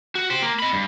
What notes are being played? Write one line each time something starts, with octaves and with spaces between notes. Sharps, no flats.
F#4
G4 C5
A#3
D#5 B5
G2